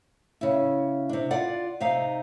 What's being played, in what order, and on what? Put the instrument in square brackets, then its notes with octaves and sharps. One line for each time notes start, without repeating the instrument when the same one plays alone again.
[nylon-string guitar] C#3 E4
C3 D4
F4 D5 F#5
C3 D#4 F5